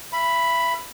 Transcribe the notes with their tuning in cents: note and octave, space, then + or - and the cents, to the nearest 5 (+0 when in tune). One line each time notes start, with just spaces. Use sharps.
E5 +30 B5 +0